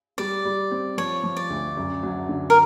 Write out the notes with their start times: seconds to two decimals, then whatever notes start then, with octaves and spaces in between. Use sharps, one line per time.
0.18 G3 D5
0.45 G3
0.71 C4
0.98 F3 C#5
1.24 F3
1.37 D5
1.50 D2
1.77 F#2
2.03 F#3
2.29 D3
2.50 A#4